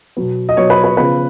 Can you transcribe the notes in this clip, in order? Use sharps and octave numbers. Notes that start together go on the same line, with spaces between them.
B2 F#3 B3
D#5
B2 F#3 B3 C#5
B4
B4
C#3 F3 B3 B4